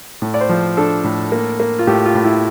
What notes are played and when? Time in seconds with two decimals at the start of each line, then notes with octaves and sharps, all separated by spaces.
0.22 A2
0.34 D5
0.41 C5
0.49 F3
0.77 D4 A4
1.04 A2
1.32 A#3
1.60 A#3
1.79 F4
1.87 A2 G4
2.06 F4
2.15 A2
2.24 E4